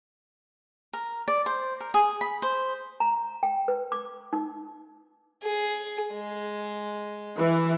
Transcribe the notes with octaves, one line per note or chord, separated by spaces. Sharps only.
A#4
D5
C5
A#4
G#4
B5
C5
A#5
G5
B4
D6
D#4
G#4
G#3
E3